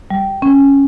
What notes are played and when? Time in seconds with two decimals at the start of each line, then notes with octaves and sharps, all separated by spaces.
0.10 G3
0.42 C#4